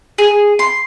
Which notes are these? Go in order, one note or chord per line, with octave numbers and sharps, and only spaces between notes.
G#4
C6